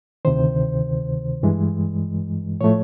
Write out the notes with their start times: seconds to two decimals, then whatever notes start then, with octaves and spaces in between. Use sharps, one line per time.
0.25 D2 C3 D#3 C5
1.43 G2 E3 G#3
2.61 A2 F3 A3 C#5